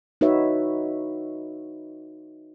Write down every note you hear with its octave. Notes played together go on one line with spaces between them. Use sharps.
D#4 F#4 B4 C#5 E5